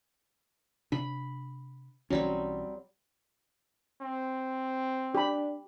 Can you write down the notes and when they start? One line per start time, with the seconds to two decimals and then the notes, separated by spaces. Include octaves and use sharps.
0.92 C3 D4 B5
2.10 B1 E3 F#3 G3 C4 C#4
4.01 C4
5.15 D4 G4 B5